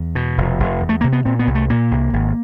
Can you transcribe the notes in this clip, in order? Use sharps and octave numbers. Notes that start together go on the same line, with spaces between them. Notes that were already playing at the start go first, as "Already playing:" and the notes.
Already playing: E2
B2
F1
F1
E2
A3
C3 A#3
B3
A#2 C4
B3
C2
A3
A#2 A#3
C2
G#1